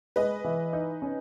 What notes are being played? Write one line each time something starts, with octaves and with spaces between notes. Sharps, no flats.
G#3 B4 D#5
E3
D#4
C#4